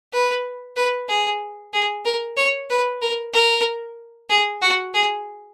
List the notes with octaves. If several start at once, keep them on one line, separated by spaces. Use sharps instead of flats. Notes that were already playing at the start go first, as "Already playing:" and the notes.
B4
B4
G#4
G#4
A#4
C#5
B4
A#4
A#4
G#4
F#4
G#4